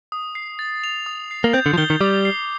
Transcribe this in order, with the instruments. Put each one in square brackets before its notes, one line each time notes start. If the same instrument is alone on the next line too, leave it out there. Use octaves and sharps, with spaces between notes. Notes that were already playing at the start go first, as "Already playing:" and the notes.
[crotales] D#6
C7
A6
F7
D#6
C7
[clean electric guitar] A#3
[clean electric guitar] C4 [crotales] G6
[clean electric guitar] D3
F3
[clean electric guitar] D#3 [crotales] G7
[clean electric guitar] D#3
[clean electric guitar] G3 [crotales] D6
[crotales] C7